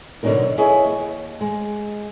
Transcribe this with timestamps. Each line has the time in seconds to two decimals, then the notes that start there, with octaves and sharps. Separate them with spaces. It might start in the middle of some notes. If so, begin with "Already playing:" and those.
0.23 B2 D3 F#3 G#3 D#4 A#4
0.58 E4 G#4 B4 C#5 D#5
0.85 D#2
1.41 G#3